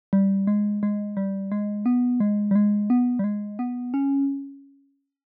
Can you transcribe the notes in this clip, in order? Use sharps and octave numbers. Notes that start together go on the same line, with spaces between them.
G3
G#3
G#3
G3
G#3
B3
G#3
G3
G#3
B3
G3
G#3
B3
C#4